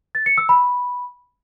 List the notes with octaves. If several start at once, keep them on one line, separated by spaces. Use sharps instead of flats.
A6
C#7
E6
B5